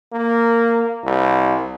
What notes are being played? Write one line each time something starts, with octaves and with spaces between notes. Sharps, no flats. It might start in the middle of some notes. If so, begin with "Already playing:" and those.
A#3
C2